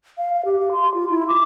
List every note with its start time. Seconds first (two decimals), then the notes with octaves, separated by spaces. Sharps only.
0.18 F5
0.33 F5
0.45 G4
0.60 G4
0.72 C6
0.94 F4
1.10 E4
1.28 D6